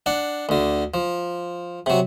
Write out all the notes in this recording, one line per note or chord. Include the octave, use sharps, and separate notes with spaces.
D4 F#5
D2 D3
F3
C3 F#3